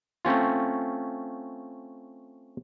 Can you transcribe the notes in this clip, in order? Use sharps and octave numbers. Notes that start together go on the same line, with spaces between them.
A3 C4 C#4 F4